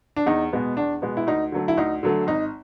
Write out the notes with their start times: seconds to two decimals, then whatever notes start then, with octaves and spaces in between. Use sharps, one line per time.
0.16 D4
0.26 E2 D#4
0.53 B2 G#3 B3
0.77 E2 D4
1.02 B2 G#3 B3
1.17 E4
1.27 D2 D#4
1.52 D3 F#3 A3
1.68 E4
1.77 D2 D#4
2.03 D3 F#3 A3
2.27 G#1 D#4